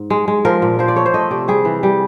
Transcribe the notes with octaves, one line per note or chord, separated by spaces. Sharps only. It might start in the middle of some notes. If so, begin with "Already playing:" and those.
Already playing: G#2
G#3
G#3
F3 A#4
A#2
F3 C5
D5
A3 C#5
C5
A3 D#5
C3 D5
G3 G#4
E3
G3